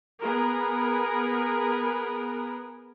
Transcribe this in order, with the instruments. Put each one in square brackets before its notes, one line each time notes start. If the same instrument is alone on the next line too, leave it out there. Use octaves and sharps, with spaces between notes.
[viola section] B3 G#4 A#4 B4